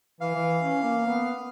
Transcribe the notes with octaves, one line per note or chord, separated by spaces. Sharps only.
E3 F5
E3
C#4
A#3
B3